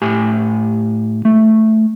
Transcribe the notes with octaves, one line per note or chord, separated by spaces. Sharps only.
A2 G4 G#5
A3